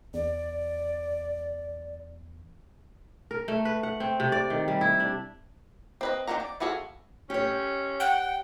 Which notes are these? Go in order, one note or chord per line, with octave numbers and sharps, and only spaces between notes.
E2 D5
A#4
A3
B4
F#5
C4
C3
D5
D#3
G3
E4
D4
C4 B4 D#5
D#3 A#3 C4 F#5 A#5
D5
B3 F4 F#4 G#4 A4
C#4 G4 C#5
F#5 G5